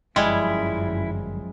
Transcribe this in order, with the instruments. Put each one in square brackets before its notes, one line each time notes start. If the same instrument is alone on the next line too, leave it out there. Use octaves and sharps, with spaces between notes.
[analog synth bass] G1 [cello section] F#2 F3 [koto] G3 G#3 [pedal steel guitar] E4